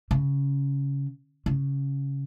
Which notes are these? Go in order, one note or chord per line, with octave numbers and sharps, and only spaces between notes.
C#3
C#3